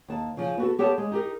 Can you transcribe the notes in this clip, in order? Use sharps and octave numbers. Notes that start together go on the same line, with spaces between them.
D#2 A5
C#3 F3
B3 F#4 A4
B3 G4 A4 C#5 A5
G#3
D#4 G4 A#4